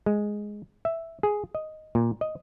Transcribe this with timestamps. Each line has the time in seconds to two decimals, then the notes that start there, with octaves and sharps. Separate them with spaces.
0.06 G#3
0.85 E5
1.23 G#4
1.55 D#5
1.95 A#2
2.21 D#5